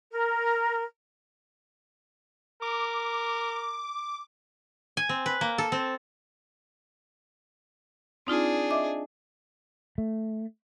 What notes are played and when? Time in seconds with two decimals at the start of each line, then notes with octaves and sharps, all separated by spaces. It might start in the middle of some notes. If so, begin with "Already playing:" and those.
0.12 A#4
2.62 A#4 D6
4.97 G#5
5.09 C4
5.26 B4
5.41 A#3
5.58 A4
5.72 C4
8.27 C4 D4 D#4 F4 G#4
8.70 D#5 E5 D6
9.98 A3